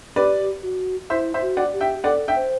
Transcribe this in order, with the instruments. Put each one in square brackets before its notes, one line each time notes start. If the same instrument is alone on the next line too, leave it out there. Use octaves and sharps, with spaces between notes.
[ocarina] G4 [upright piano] B4 D5
[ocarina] F#4
[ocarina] E4 [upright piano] C5 E5
[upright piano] C5 E5
[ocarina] F#4
[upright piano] D5 F#5
[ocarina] G4
[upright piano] E5 G5
[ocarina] A4 [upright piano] D5 F#5
[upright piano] E5 G5
[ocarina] C5